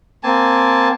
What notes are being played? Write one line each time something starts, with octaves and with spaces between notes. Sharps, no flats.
A#3 C4 G#5 A5